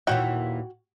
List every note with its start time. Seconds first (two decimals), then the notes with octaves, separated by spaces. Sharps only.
0.07 D#2 A#2 E3 F#4 C#5 G5